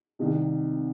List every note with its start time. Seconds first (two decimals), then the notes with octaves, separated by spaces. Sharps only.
0.19 C2 C3 D#3